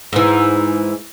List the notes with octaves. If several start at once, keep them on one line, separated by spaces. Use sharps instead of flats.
G#2 E3